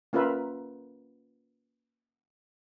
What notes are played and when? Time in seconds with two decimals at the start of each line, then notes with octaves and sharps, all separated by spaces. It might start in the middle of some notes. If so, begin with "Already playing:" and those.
0.13 A#3 C#4 F4 A#4 B4 E5